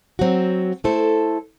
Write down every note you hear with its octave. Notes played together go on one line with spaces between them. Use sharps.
F#3 C4 F#4
A3 E4 A4 C5